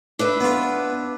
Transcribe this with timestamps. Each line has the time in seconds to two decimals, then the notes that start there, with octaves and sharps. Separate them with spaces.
0.19 D4 B4 E5
0.40 B3 F4